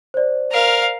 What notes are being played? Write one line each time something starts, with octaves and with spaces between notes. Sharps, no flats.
C5 D5
A#4 F5